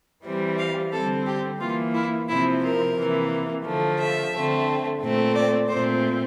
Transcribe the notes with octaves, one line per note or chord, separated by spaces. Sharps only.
E3 G3 C4
F5
D3 G3 C4 A4
G4
E3 A#3 F4
E4
C3 F3 C4 E4
A#4
C3 E3 A#3
D3 F3 A3
E5
D3 A3 C4
A#2 A3 C4
D5
A#2 A3 C4 C5